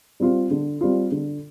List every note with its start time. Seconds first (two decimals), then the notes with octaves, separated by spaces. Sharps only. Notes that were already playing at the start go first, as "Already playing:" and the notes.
0.20 G3 C4 F4
0.51 D3
0.81 G3 C4 F4
1.12 D3